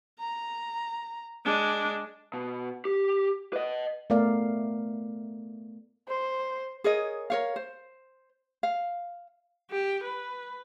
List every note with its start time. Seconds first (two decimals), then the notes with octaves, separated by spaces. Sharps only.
0.19 A#5
1.45 G#3 D4
2.33 B2
2.85 G4
3.53 B4 D#5
4.10 A3 B3 A#4 D5 F5
6.08 C5
6.84 G#4 A#4 C#5 D#5
7.30 A#4 C#5 F5
7.56 C5
8.63 F5
9.71 G4
10.04 B4